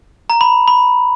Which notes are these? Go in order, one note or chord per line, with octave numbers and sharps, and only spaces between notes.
A#5
B5
B5